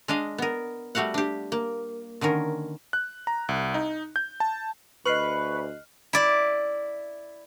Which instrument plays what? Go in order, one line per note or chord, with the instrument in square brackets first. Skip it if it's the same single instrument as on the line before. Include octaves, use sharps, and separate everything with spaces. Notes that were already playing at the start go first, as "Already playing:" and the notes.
[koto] G#3 D4 D#5 F5
B3 A#4
G3 A3 F#4 F5 F#5
D4 G4
A#3
D3 D#3 C#4 A#4
[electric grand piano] F#6
A#5
C2
D#4
G6
A5
[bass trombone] D2 [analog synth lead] B4 [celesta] D#5 C7 F#7 [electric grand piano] C#6 F6 F#6
[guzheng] E4 D5